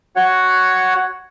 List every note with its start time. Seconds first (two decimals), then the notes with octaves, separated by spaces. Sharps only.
0.16 F#4 C#5 F#5